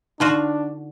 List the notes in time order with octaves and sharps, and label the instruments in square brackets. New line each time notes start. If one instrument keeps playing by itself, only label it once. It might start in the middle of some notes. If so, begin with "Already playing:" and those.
[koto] D3 F4 F#4 [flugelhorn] D4 [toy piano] D#4